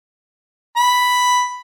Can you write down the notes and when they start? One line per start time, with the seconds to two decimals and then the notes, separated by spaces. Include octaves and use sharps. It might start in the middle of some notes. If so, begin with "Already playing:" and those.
0.77 B5